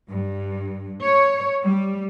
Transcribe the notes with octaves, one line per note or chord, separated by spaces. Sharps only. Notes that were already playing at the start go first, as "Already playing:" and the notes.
G2
C#5
G3